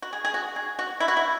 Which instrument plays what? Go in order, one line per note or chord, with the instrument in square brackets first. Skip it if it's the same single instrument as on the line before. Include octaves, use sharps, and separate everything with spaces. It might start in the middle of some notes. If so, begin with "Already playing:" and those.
[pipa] F#4
G#4
G#4
F#4
G#4
F#4
E4
F#4
E4